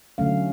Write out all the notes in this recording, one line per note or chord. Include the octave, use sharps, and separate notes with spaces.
D3 F#3 A3 C#4 F5